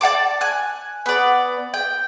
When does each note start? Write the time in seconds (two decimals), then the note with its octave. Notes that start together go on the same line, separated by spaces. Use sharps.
0.01 D5 F#5 A5 D6
0.41 G#5 F#6
1.06 B3 D5
1.74 G5